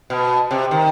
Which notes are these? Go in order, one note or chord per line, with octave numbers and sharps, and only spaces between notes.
B2
C3
D#3